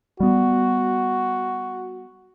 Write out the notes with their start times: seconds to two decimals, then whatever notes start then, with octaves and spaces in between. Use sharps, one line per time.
0.20 G3 B3 F#4